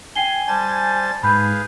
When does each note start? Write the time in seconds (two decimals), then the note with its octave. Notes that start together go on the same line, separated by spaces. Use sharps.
0.16 G5 G#5 C7 G7
0.48 G3 C5 A5 A6
1.23 G#2 G#4 B4 F5 B5 G6